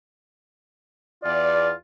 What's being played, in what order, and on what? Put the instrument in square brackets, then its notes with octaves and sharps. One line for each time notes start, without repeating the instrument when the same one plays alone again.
[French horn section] E2 D5 [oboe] F4